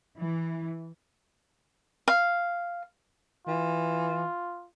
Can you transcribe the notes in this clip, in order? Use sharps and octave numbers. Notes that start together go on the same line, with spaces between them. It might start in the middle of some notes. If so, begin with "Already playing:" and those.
E3
F5
E3 F4